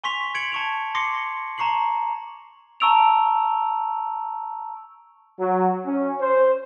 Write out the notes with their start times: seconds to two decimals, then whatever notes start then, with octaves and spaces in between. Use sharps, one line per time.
0.04 G#5 C6 C#6 B6 F7
0.35 G#6 C#7 D7 F#7
0.52 A5 C#6 F7
0.95 C6 D6 A#6 C7 C#7
1.58 A5 A#5 C#6 C7 F#7
2.80 A5 A#5 C#6 E6 D7 F7
5.39 F#3
5.86 C#4
6.21 C5